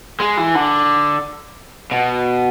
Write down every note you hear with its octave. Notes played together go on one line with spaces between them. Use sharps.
G#3
E3
D3
B2